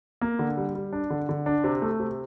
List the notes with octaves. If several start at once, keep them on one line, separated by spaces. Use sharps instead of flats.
A#3
D3
G3
G3
D4
D3
D3
D4
C3
A3
C3